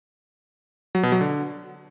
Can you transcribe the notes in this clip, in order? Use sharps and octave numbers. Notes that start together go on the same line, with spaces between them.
F#3
B2
F#3
D3